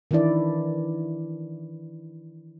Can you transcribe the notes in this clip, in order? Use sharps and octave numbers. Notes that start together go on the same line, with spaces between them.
D#3 E3 D4 E4 D5